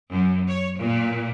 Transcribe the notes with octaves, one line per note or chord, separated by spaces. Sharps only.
F#2
C#5
A#2